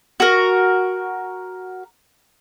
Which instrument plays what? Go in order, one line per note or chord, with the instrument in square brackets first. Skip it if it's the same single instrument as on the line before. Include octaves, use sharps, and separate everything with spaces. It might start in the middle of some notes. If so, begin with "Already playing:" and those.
[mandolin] F#4 A#4